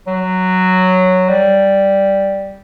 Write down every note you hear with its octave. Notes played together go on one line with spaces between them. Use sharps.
F#3
G3